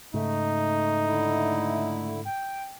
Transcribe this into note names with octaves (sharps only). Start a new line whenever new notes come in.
G#2 C#3 A3 D#4
D3 E4
G5